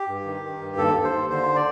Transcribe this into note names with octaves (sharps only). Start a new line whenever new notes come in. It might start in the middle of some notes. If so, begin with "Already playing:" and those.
Already playing: G4
G2
D#3
D#3
G2
D#2 A4
D#2
C5
D#2
D3 C5
D5